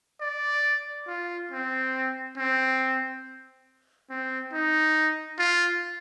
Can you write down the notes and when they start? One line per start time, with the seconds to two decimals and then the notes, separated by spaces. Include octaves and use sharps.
0.21 D5
1.07 F4
1.51 C4
2.37 C4
4.10 C4
4.53 D#4
5.38 F4